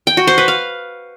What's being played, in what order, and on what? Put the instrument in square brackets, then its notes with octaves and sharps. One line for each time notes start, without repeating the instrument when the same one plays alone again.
[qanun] G5
F#4
C5
B4
F5